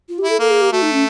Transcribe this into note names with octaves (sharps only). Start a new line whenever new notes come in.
F4
G4
E4
A4
A#3 A4
G#4
G4
A3 F#4
D#4
C#4